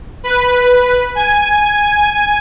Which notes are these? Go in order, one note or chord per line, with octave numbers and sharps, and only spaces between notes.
B4
G#5